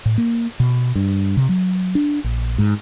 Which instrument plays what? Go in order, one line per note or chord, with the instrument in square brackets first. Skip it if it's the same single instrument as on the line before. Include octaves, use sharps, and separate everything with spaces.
[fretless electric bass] A2
A#3
B2
G2
C3
F#3
D4
A#1
G#2